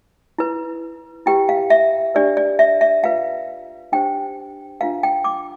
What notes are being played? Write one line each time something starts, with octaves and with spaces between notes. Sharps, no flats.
E4 B4
E4 G4 B4 G5
F5
E5
D4 G4 B4 D5
D5
E5
E5
F4 B4 F5
D4 G4 C5 G5
D4 F4 B4 F5
G5
D6